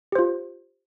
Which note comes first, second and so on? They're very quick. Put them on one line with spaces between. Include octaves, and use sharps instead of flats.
G4 C5 F4